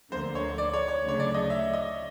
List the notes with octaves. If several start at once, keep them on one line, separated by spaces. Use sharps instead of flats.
D2 D3 F3 A#3 C5
C#5
D5
C#5
C#5
D2 C#3 F#3 A3 D4 C#5
D5
D#5
E5
D#5